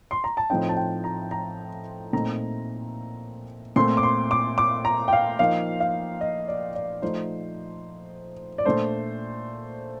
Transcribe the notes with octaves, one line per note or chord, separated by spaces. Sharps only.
C6
A#5
A5
A2 F3 C4 D#4 G5
A5
G5
A#5
A#5
A#2 A3 C4 D#4 A#5
A#2 A3 C4 C6
D6
C6
D6
D6
A#5
G5
F5
F3 A#3 D#4 F5
F5
D#5
D5
D5
F3 A3 D#4 C5
D5
A#2 A3 D4 C5